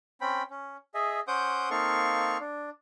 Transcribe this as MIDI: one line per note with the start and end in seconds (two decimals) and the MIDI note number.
0.21 0.43 60
0.21 0.43 61
0.21 0.43 79
0.21 0.43 83
0.50 0.77 61
0.94 1.20 68
0.94 1.20 75
0.94 1.20 76
1.28 1.69 61
1.28 1.69 72
1.28 1.69 78
1.28 1.69 86
1.28 1.69 87
1.28 1.69 91
1.70 2.38 58
1.70 2.38 60
1.70 2.38 63
1.70 2.38 69
1.70 2.38 77
1.70 2.38 85
2.40 2.70 62